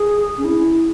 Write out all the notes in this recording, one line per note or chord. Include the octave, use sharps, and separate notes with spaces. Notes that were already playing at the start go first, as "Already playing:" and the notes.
Already playing: G#4
C#4
E4